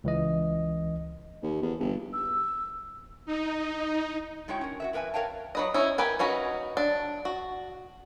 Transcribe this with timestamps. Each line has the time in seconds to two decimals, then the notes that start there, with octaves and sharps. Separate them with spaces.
0.04 C#2 E3 D#5
1.42 D#2
1.62 E2
1.79 G1
2.13 E6
3.26 D#4
4.48 A2 G#3 E4 F#4 C#5 G5
4.61 C#4 A#4
4.80 F#4 B4 E5
4.93 F2 A#4 B4 E5 G#5
5.14 A#4 B4 C#5 F5 G5 A5
5.55 F#3 B4 D#5
5.74 C#4 D#4 E4
5.98 G4 A#4 B4 G#5
6.19 C#4 D#4 F#4 B4
6.77 D4
7.25 F#4